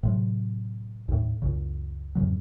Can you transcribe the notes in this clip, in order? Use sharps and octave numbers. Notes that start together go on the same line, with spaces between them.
A2 C3 F#3
D#2 A2
C#2 F#2 C#3
F2 G#2 C#3 F#3